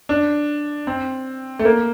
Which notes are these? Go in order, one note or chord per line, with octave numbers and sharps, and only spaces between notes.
D4
C4
A3
A#3